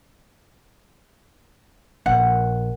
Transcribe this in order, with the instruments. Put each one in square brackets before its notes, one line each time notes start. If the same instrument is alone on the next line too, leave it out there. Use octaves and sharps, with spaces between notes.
[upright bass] A#1 [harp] F#5